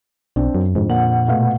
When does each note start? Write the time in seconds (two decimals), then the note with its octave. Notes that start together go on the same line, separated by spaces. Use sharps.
0.36 B1 C4 D4 D5
0.55 F#2
0.75 F2 G#2 D3
0.90 A#2 F#5
1.27 B2 A3 F5